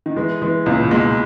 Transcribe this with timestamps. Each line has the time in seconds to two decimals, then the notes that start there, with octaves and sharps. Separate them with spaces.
0.06 D#3
0.16 E3 G#3
0.42 E3 G#3
0.66 C#2 A#2
0.83 A#2
0.91 B2 G#3